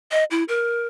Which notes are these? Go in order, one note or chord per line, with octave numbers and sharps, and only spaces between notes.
D#5
E4
A#4